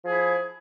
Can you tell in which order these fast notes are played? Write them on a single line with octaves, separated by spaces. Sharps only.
F3 G#4 E4